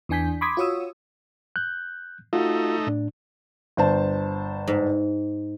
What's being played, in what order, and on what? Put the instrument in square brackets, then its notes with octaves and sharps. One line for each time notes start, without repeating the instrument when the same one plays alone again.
[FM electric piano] E2 E3 D4 G#5 G6 B6
B5 C6 D6 D#6 G#6 B6
F4 F#4 C#5 C#6 D#6 E6
[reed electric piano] F#6 G6
[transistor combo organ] A3 D#4 [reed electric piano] F4 F#4
[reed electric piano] A2 D4
[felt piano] G1 C5 A5
[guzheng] G#2